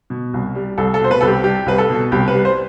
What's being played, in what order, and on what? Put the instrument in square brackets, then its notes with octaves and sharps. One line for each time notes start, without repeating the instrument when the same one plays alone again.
[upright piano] B2
C2
G3
C2 A4
A4
B2 C5
B4
C2 A4
G4
G3 G4
C2 B4
A4
B2
C2 G4
B4
G3
C5